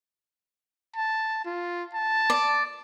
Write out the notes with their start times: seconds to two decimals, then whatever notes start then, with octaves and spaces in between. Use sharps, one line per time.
0.96 A5
1.45 F4
1.94 A5
2.30 D5